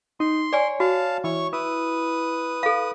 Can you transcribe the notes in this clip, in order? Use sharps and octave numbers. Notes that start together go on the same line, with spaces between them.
D#4 C6
C#5 D5 G#5
F#4 F5 A5
E3 C#5 C#6
E4 B4 D#6
A4 F5